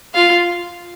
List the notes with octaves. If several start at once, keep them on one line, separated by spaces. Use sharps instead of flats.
F4 F5